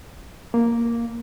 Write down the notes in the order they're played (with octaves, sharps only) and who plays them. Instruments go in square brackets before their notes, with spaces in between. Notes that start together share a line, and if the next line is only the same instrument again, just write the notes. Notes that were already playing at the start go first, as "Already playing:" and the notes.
[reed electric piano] A#3